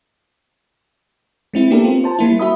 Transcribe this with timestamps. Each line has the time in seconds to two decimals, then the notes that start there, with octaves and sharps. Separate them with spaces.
1.54 G#3 C4 E4
1.70 A#3 B3 D4 G4 A4 A#4
1.84 C4 F4
2.04 C5 A5
2.19 G3 A#3 E4
2.39 F#4 E5 B5 D#6